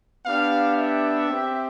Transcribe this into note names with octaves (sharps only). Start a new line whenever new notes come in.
B3 D4 G4 F5
E5
C4 G4